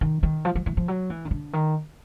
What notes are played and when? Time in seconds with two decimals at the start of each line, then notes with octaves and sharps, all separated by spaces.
0.01 D#3
0.23 D#3
0.45 F3
0.55 F3
0.66 E3
0.77 F3
0.88 F#3
1.10 E3
1.25 D#3
1.31 D3
1.53 D#3